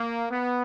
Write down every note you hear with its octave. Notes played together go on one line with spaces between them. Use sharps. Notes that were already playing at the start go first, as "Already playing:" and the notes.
Already playing: A#3
B3